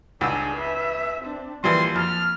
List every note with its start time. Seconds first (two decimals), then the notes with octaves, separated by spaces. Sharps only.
0.21 C#2 G2 D4 G#4 E6
0.56 B4 E5
1.20 C4 D4
1.64 E3 F3 G3 A#3 C6
1.96 F2 F6